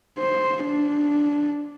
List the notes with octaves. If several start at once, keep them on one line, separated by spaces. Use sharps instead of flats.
C5
D4